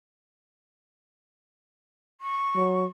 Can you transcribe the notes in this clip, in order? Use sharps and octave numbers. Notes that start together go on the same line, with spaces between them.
C#6
F#3